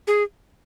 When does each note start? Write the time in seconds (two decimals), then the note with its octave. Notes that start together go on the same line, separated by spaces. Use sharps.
0.07 G#4